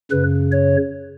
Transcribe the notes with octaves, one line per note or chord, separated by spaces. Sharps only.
F#2 C#3 B4
C#5